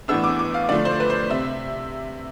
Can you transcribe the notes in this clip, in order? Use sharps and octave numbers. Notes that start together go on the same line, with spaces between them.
A2 E3 B3 D4 E6
D6
D6
F5
D3 F3 A3 D4 D5
C5
B4
C5
C3 E5